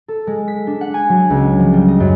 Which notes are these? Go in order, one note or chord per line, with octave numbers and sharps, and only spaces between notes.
A4
G#3
B6
D4
F#5
G#5
F#3
C#2
F3
G3
D#5
F#2